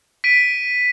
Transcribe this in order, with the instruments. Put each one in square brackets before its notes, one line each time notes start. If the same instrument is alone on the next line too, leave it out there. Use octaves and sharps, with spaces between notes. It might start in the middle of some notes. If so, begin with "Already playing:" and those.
[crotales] B6 D7 D#7